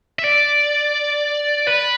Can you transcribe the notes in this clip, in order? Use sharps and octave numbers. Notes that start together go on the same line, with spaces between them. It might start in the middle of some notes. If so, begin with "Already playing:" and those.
E5
D5
B4